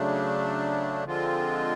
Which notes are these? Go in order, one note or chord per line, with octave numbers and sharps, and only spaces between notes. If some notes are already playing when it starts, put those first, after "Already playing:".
Already playing: C#3 F#3 A3 D4
D3 F3 G#3 C4 F4